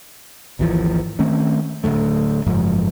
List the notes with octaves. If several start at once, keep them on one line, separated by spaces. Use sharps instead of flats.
G#1 D#2 E3 F3
D#3 A3 C4 C#4
D1 G#1 D2 A3
F#1 G#2 F3